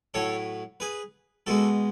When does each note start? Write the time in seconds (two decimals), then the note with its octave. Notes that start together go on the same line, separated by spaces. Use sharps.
0.14 A2 F#3 A4 C#5
0.80 G#4 B4
1.46 B2 G#3 F#4 A4